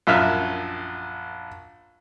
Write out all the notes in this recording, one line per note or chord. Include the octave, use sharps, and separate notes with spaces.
A#1 F#2 E5 F6